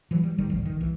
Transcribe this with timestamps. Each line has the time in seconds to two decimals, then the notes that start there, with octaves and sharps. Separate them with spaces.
0.11 E3 F#3
0.23 G3
0.38 G#1 D#3 G3
0.50 D1 G1 F3
0.66 D#3
0.81 C2 E3